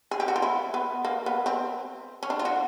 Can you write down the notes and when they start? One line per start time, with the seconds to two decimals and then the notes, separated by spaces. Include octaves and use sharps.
0.11 G#4
0.20 G4
0.28 F#4
0.36 F4
0.42 E4
0.74 B3
1.05 A#3
1.26 B3
1.46 C4
2.23 C#4
2.30 D4
2.39 F4
2.45 F#4